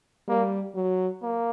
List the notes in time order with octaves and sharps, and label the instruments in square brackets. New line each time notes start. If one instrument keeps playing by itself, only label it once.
[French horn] G3 [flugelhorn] A#3
[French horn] F#3
[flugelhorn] A#3